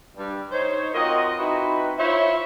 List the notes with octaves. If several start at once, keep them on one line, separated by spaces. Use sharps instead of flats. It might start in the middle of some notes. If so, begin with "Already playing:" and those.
G2 G3
D#4 C5 C#5
C4 F4 F#4 A#4 D#5
C4 D#4 E4 F#4 B4
E4 F4 C5 C#5 E5